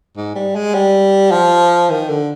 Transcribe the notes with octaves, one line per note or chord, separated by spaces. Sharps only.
G#2
G3
G#3
G3
F3
D#3
D3